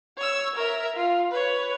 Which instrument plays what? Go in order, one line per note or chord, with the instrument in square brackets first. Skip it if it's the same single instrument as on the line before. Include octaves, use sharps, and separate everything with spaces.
[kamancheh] C#5 E6
A#4 E5
F4
B4 C#5